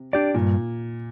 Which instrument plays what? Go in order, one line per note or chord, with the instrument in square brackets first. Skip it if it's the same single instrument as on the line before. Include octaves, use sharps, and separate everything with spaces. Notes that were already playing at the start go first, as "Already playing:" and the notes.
Already playing: [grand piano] C3
[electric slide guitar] D4 G4 D5
[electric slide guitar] G2 [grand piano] A#2